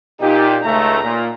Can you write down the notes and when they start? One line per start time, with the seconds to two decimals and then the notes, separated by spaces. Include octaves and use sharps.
0.21 A#2 D#4 G4
0.64 C#2 A3 A#5
1.03 A#2